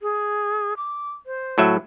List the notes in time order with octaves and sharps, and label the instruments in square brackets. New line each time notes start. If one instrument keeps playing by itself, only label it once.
[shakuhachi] G#4
D6
C5
[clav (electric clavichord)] A2 F#3 E5